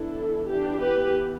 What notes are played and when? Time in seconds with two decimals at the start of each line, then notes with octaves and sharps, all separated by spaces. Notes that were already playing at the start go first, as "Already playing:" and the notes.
Already playing: E3 B3 D4 E4 A4
0.49 D4 G4
0.81 G4 B4